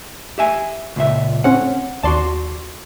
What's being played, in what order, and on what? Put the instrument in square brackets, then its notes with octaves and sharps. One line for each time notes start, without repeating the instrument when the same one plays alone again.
[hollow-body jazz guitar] G4 E5 G#5
C#2 A#2 E5
[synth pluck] A2 C4 C#4 [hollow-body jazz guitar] F#5
[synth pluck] D#2 D5 C6 [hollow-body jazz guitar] F#4 A5